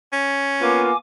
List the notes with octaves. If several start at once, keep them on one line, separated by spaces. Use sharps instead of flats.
C#4
A#3 B3 F4 G#5 D6